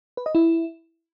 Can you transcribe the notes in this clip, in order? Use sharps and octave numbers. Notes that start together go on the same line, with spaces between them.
B4
D#5
E4